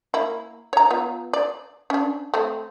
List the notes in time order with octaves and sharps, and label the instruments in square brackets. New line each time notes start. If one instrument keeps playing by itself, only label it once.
[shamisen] A#3 E4
C#5 A#5
B3 F4
D5
C#4 D4
A3 C4